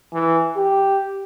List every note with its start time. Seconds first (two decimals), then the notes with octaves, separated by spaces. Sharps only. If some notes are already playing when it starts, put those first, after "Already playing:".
0.13 E3
0.56 G4